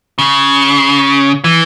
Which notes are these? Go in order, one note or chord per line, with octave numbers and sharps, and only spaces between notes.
C#3
E3